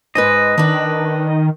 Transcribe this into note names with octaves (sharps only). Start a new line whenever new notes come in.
G#2 G#3 B4 D#5
D#3 D4 B4